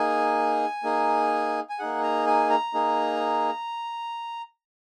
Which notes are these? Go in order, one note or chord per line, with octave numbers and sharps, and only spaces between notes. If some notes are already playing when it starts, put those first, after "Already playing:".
Already playing: A#3 D#4 G#4 G#5
A#3 D#4 G#4
G#5
A#3 D#4 G#4 F#5
A#5
G#5
A#5
A#3 D#4 G#4